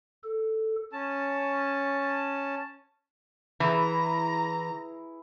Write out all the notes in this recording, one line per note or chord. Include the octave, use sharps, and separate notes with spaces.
A4
C#4 A5
E3 E4 G#4 A#5